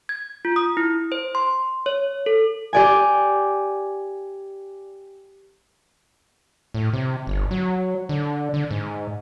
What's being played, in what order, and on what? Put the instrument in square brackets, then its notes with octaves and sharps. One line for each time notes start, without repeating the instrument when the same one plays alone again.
[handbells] G#6
F4
D#6
E4
C5
C6
C#5
A4
[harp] G4 D5 G#5
[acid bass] A2
C3
G1
F#3
D3
D3
G#2